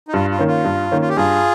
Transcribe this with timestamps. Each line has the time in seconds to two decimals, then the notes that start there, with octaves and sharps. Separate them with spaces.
0.08 D#4
0.13 G2 F4
0.30 F4
0.39 D#3 A#3 C#4
0.48 F4
0.64 G2
0.91 D#3 A#3 C#4
1.01 F4
1.09 G4
1.16 G2 F4 G#4